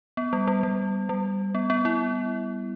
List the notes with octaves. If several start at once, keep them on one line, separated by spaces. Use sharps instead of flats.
B3
G3
G3
G3
G3
B3
B3
B3 E4